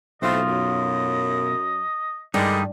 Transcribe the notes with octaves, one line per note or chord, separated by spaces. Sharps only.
B1 A2 A3 C4 F4 D#5
F#2
G2 D3 D#3 G3 G#3 D#4